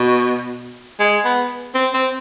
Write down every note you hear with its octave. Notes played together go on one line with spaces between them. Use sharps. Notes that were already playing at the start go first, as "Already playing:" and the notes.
Already playing: B2
G#3
B3
C4
C4